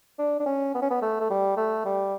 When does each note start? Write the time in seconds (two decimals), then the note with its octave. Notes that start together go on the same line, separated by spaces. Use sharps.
0.19 D4
0.40 D4
0.46 C#4
0.74 B3
0.82 C#4
0.90 B3
1.02 A3
1.20 A3
1.30 G3
1.57 A3
1.85 G3